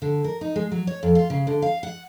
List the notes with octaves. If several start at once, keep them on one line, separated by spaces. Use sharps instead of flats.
D3
A#4
D#4
G#3
F#3
C#5
F2
F4
C#3
D3
F5
F#5